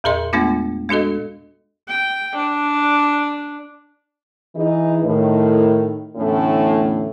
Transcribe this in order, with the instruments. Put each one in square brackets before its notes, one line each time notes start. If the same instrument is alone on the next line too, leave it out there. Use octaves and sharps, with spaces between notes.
[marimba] E2 A#2 G#4 A#4 D#5 C6
G#3 A3 B3 D4 F4
G#3 D4 F#4 A4 D#5
[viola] G5
D4
[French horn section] E3 D#4 G#4
A2 D#3
E2 A2 D3 A3 C#4